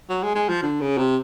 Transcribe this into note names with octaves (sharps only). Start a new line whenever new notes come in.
F#3
G#3
G#3
F3
D3
C#3
C3